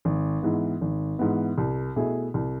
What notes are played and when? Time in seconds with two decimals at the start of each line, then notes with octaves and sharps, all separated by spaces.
0.05 G#1
0.43 G#2 E3 B3
0.81 G#1
1.19 G#2 E3 B3
1.58 C2
1.96 B2 A3 E4 G#4
2.34 C2